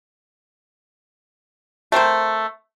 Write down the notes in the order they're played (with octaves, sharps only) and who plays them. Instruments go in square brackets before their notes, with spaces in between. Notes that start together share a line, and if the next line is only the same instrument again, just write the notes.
[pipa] A3 C4 A#4 C5